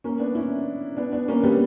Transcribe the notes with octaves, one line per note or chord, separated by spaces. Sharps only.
A#3 C#4
B3 D4
C#4 E4
B3 D4
B3 D4
A#3 C#4
G3 B3